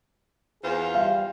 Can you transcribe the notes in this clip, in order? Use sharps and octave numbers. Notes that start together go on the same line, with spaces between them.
E2 F4 G#4 C5
G3 F5